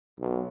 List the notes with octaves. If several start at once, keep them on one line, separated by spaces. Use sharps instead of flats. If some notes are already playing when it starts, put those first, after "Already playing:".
B1